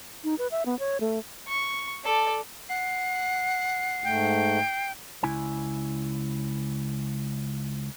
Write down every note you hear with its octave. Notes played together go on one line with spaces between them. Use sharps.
D#4
B4
E5
B3
C#5
A3
C#6
A4 D5
F#5 C7
G#2 A3 G5
C#2 E4 G#5